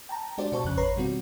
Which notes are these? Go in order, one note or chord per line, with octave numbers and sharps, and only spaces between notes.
G5 A5 A#5
G#3 D4 F#4 G4 C5 D5
B2 F#4 C5 D5 A5 C#6
F2 C#3 C#4 F#6
G#1 B4 C#5 A#5 C6 C7
B2 D#3 G3 C4 F4 F#4